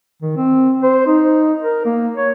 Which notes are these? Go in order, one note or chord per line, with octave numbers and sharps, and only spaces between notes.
D#3
C4
C5
D#4
A#4
A#3
C#5